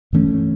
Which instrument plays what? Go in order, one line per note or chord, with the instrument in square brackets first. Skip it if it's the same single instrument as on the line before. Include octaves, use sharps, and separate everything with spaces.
[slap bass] G2 E3 A3 C#4